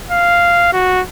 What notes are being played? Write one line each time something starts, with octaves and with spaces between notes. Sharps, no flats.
F5
F#4